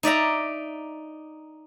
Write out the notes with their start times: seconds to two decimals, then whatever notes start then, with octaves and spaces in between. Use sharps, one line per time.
0.03 D#4 D5 E5 A#5